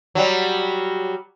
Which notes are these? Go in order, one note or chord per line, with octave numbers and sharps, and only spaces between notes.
F#3 G3